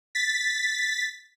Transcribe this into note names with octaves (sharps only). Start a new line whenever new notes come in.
A6 B6